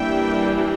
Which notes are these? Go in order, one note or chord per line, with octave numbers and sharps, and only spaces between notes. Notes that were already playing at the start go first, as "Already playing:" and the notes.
Already playing: E3 G3 A#3 D4 E5 G5